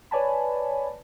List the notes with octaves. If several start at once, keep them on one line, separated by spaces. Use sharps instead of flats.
B4 C#5 D5 G#5 A5 B5